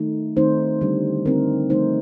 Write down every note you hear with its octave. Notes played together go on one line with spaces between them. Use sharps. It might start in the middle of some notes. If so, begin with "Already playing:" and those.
Already playing: D#3 A3 D#4
D#3 A3 C4 D#4 C5
D3 G3 D4
D3 A3 C4 D#4 A#4
F3 A3 D#4 C5